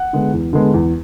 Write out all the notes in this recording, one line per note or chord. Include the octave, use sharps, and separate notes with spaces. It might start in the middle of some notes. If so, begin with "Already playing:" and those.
Already playing: F#5
D3 G#3 B3
E2
D3 G#3 B3
E2